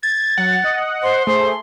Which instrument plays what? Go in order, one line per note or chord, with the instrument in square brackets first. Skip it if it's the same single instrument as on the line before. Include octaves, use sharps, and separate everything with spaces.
[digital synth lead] G#6 [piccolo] A6
[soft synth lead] F#3 [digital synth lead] F#5
[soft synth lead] D#5
[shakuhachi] C5 [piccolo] C6
[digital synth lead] A3 [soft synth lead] G#4 [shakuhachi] C5